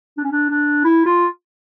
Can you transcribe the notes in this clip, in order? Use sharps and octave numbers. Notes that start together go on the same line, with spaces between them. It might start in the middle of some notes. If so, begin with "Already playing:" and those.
D4
C#4
D4
D4
E4
F4